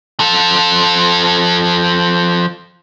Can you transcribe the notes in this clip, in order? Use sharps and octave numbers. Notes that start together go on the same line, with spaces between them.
F3 A4